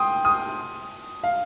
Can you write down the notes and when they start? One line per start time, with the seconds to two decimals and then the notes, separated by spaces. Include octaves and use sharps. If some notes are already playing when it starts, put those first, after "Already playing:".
Already playing: G5 C6 D#6
0.25 D#6
1.24 F5